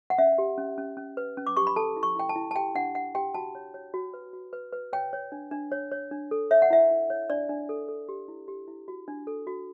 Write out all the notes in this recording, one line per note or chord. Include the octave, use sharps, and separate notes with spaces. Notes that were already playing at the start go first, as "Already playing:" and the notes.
F#5
C#4 E5
G4
C#4
C#4
C#4
B4
C#4
D6
G4 C#6
B5
A4 A5
E4
C#6
E4 G5
A5
E4
A5
G4 G5
D4 F#5
D4 F#5
G4 G5
F#4 A5
C#5
C#5
F#4
B4
F#4
B4
B4
C#5 G5
C#5
D4
D4
C#5
C#5
D4
A4
C#5 E5
F#5
E4 E5
E4
C#5
D4 D5
D4
A4
A4
G4
E4
G4
E4
F#4
D4
A4
F#4